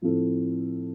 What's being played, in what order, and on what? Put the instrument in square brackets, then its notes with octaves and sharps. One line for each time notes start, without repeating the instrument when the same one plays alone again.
[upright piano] A2 F3 C4 A4